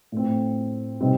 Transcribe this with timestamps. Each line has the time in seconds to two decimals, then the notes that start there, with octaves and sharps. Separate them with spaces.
0.12 A2 A3 C4
1.00 C3 G3 C4 D#4